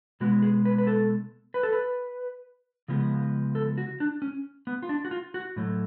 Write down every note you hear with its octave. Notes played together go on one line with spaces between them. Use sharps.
B2 G#3 B3 F#4
G#4
B4
B4
A4
B4
A4
B4
C#3 F3 G#3 B3
A4
F#4
D4
C#4
B3
F4
D4
F#4
F4
F#4
A2 F#3 A3